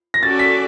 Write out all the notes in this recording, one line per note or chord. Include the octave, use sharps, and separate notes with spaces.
A#6
C#4 F#4 A4 D5 A6
B6